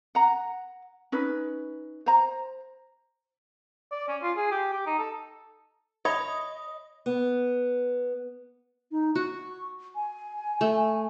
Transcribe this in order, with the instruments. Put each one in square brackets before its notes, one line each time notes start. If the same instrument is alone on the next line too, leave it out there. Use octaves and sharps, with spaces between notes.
[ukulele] F#5 A#5
C#4 D#4 B4
C5 A#5
[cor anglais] D5
C#4
F4
G#4
G4
G4
D#4
A4
[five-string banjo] C#5 [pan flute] D#5 [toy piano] E5 B5 [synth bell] D#6
[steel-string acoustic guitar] B3
[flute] D#4
[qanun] F#4 [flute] C#6
[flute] G#5
[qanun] A3